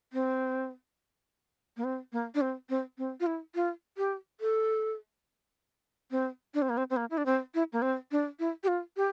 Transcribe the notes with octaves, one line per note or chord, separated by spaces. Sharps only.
C4
A#3
C4
A#3
D4
C4
C4
C4
F4
E4
F4
G4
A4
C4
D4
C4
A#3
C4
C4
A#3
E4
D4
C4
E4
A#3
C4
D4
E4
G4
F4
G4